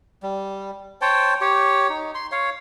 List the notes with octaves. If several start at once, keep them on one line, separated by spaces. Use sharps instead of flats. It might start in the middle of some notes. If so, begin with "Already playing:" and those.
G3
C5 C#5 G5 A5
G4 C#5
D#4
C6
C#5 F5